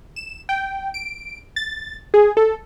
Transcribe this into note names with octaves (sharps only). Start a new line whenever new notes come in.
E7
G5
D7
A6
G#4
A4